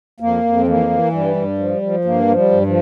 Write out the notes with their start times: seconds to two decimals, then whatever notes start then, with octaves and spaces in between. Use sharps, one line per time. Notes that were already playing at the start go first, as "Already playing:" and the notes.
0.20 F2 A#3
0.44 F2
0.56 C4
0.67 E3 A#3
0.90 E3
1.12 G2 G3
1.36 G2
1.58 F3
1.82 F3
2.05 G2 A#3
2.28 F3
2.36 G3
2.51 G2
2.66 F3